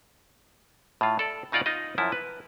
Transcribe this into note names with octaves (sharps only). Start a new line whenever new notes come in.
A2 F4
A4 D5
C#3 D#4 F4 D5 F#5
D#4 F4 D#5
F#2 F3 E4
B4